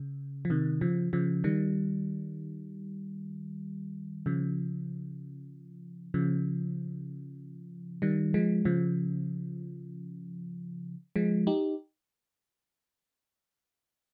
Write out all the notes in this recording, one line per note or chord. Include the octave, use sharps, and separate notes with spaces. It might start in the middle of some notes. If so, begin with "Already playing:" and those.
Already playing: C#3
F3
C3 D#3
C#3 F3
C#3 F3
D#3 G3
C#3 F3
C#3 F3
D#3 G3
F3 G#3
C#3 F3
F3 G#3
D#4 G4